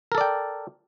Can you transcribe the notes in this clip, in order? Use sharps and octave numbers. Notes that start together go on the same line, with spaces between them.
A4 A#4 D5 G5